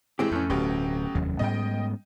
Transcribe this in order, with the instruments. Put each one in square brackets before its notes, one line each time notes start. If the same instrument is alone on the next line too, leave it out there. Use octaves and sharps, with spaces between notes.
[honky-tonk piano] A2 E3 [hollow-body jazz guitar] G#3 C4 G4
[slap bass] F2 [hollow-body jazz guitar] A3 C#4
[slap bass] D1 [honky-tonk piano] B2 F#3 G4
[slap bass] F1 D#2 F#3
[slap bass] G#2 G3 B3 [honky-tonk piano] D#5 G5